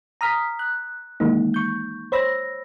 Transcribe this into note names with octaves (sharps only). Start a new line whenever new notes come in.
A#5 D#6 F6 B6
F#6
D#3 E3 G#3 A#3 D#4
C#6 G6
C5 C#5 B5 E6 A#6